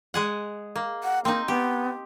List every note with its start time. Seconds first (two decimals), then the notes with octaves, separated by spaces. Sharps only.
0.14 G#3 G#4 F#5
0.76 A#3
1.04 F#5
1.25 A#3 C4 D#4
1.48 B3 G4